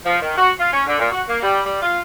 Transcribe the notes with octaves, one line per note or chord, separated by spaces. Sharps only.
F3
D#3
F#4
F4
C#4
D3
A#2
F#4
A#3
G3
G3
F4